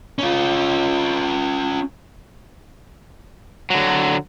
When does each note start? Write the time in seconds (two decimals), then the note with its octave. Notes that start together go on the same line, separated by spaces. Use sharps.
0.19 C#4 F4
3.70 D3 F#3